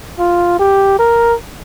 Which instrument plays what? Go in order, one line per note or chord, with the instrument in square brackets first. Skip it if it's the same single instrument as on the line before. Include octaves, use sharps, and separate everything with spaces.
[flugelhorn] F4
G4
A#4